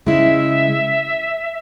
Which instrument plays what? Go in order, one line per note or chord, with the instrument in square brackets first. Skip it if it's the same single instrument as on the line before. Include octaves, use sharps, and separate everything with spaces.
[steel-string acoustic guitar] C#3 G#3 E4 [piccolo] E5